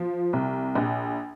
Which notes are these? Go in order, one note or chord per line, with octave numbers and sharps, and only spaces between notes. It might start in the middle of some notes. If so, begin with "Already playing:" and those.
Already playing: F3
C2
A#1